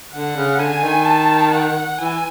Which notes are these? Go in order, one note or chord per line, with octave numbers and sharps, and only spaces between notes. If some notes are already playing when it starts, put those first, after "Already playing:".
D3 F#5
C#3
D3 G#5
D#3
A5
F#5
E3 G#5